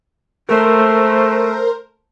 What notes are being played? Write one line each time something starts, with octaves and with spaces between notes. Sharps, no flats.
A3 A#4 C5